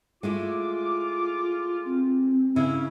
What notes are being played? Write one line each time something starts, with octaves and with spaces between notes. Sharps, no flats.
G#3 A3 E4 F4 D6
C4
C#3 C#4 E4